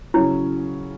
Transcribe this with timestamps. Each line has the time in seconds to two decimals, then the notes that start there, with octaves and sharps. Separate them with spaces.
0.14 C#3 F#3 C#4 E4